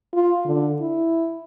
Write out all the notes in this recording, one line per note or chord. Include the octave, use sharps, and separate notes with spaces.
F4
D3
E4